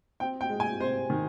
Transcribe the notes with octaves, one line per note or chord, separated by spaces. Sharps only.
C4 G5
G5
G#3
G#5
C3 C5
D#3